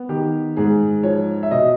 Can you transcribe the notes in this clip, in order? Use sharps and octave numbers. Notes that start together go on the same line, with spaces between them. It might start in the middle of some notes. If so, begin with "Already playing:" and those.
Already playing: B3
D#3 G4
G#2 G#4
F3 C#5
E5
B2 D#5